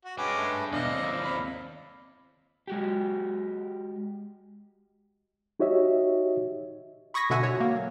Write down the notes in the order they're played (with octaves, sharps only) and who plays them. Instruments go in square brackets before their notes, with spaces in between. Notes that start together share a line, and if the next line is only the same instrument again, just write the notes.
[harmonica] F#4
[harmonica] G#3 C#4 D6 [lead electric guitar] D4 G5 [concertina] B4
[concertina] A3 B4 G#5
[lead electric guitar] E2 B2 [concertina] D5 F5 [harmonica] D#5
[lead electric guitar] D#2 C4
[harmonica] B5
[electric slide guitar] G#3 F#4 G4
[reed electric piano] D#4 F#4 G4 C#5 D#5 E5
[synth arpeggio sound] B5 C#6 D#6 G#6 A#6 B6
B2 D3 E5 F#5 G#5
F#4 C#5
A#3
F#3